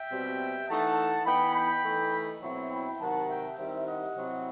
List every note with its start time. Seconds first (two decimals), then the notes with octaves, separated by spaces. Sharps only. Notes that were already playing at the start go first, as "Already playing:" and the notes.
Already playing: E5 G5
0.10 B2 G3 C4
0.68 E3 A3 D#4 F#5 A5
1.26 E3 B3 D#4 G5 B5
1.55 G5 B5
1.83 E3 A3 D#4
2.42 B2 F#3 C4 E4
2.70 G5 B5
2.99 C3 D#3 F#3 F#5 A5
3.29 E5 G5
3.57 D#3 G3 C4 E4 C5 E5
3.86 D#5 F#5
4.15 C3 F#3 C4 E4